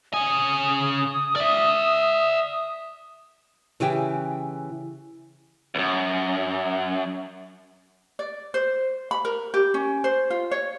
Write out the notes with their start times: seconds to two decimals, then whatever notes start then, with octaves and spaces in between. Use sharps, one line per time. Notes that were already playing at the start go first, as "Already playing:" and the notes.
0.14 C#3 G#5 D#6
1.36 D5 E5
3.80 C#3 E3 E4 G4 G5
5.75 C#2 F#2
8.19 D5
8.54 C5
9.11 B5
9.25 A#4
9.54 G4
9.74 C#4
10.04 C5
10.30 F4
10.51 C#5